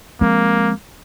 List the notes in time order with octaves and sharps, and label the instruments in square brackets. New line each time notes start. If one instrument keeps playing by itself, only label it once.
[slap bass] F3 G#3 C4 [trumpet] A#3